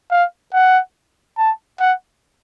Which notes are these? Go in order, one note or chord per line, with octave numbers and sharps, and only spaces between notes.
F5
F#5
A5
F#5